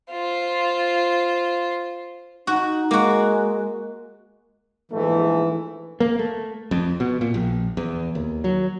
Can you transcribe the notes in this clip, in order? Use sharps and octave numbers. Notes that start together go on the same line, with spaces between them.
F4 C5
D#4 F#4
G#3 A#3 F#4
A#1 G#2 E3 A3
A#3
A3
F2
B2
A#2
A#1
E2
D#2
F#3